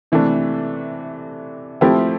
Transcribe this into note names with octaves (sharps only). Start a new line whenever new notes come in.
C3 E3 A3 D4
F3 A3 C4 E4 G4